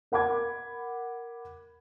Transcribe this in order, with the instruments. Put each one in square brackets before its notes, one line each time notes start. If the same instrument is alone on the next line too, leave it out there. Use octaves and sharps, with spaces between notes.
[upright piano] A#4 F#5 B5 D6 G#6